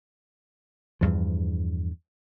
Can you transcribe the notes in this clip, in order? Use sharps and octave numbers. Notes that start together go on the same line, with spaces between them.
E2 G2 F3